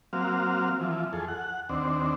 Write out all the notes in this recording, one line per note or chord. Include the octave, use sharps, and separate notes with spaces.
F#3 A#3 C4 F5
E3 F3
F2 G#4 A4
F#5
D#2 C4 D4